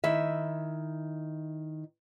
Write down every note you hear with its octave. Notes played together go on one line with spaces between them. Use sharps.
D#3 E4 E5